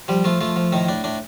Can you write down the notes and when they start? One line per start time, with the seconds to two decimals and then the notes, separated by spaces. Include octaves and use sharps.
0.08 F3 G3 G4
0.24 F3 A3 F4
0.41 F3 A3 F4
0.56 F3
0.72 A2 D#3 D#4
0.88 A2 D4
1.04 A2 D4